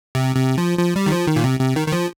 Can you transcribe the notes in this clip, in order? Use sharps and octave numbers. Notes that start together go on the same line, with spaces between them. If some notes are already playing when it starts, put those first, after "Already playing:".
C3
C3
F3
F3
G3
D#3
F3
D#3
A#2
C3
C3
D#3
D#3
F3